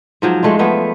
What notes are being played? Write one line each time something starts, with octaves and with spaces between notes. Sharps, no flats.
G#2 F3 F#3
G#3 A3 D4 F4
F3 A3 B3